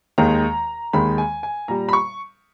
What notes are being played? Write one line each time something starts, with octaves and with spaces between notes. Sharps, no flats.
D#2 D#3 G#3 A#5
D#2 D#3 G#3 B5
G#5
G#5
A#2 G3 A#5
B5
C#6